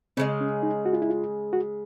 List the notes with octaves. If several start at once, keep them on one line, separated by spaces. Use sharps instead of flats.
C#3 E3 G#3 C4
C#4
D#4
F#4
F4
E4
F4
F#4